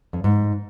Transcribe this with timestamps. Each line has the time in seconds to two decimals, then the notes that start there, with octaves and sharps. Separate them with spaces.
0.13 F2
0.24 G#2